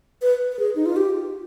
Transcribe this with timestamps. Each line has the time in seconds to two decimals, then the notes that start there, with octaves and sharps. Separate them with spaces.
0.22 B4
0.52 B4
0.59 G#4
0.76 D#4
0.86 F4
0.96 G4